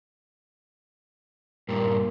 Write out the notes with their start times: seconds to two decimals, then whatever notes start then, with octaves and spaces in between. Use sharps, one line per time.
1.69 G2 A#2 A#4